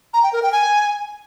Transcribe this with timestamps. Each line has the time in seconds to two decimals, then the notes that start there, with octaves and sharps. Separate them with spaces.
0.14 A#5
0.23 G5
0.33 A#4
0.42 G5
0.52 G#5